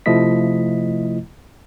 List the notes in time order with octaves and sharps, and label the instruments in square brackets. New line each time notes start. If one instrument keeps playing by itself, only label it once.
[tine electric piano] C3 F3 A3 E4 D#5 B6